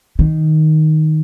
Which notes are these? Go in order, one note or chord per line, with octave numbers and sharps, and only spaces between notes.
D#3